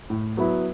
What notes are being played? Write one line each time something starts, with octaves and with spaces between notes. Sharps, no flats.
A2
F#3 B3 E4